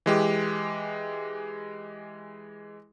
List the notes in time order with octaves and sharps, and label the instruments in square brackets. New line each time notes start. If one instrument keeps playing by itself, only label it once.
[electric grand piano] E3 G#3 G4